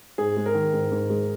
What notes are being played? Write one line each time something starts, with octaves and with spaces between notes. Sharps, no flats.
G#2 G#4
G#3
A#4
D#3
G#2
G#2
G#3